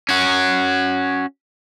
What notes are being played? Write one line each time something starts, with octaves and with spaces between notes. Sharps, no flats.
C#4 F#4